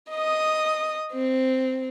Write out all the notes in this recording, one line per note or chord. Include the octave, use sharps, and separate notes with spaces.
D#5 D#6
C4